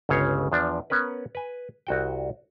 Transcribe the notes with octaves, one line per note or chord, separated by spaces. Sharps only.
G1 C#2 C#3 C#5 F5
E2 F3 D4
B3 C#4 A#4 B4
B4 G#5
C2 F#4 G5